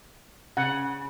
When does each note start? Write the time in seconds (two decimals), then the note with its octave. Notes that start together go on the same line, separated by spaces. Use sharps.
0.57 C#3 F#5